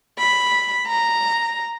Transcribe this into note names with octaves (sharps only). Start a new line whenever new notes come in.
B5
A#5